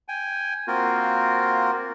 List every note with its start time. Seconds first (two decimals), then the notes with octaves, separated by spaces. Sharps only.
0.08 G5 G#5
0.68 A#3 C4 F4 F#4 A#4